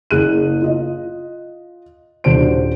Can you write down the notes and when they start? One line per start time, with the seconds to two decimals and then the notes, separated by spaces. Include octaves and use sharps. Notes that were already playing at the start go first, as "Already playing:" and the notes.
0.11 F#1 G#4 F#6 D#7
0.62 F4 D#5
2.24 D#1 D4 F#4 C5 D7